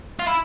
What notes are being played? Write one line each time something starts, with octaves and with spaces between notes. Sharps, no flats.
F4
E4